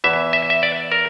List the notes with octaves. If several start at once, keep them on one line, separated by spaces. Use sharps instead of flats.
E2 E3 E5
E5
E5
D5
A#4